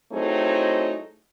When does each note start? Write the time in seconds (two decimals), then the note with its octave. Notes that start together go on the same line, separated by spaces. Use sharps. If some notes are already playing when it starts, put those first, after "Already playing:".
0.12 F#3 A3 C4 D#4 E4 G#4